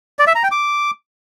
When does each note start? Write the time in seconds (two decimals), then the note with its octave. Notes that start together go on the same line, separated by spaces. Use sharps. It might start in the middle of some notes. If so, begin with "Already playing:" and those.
0.19 D5
0.27 E5
0.35 A#5
0.43 G5
0.52 D6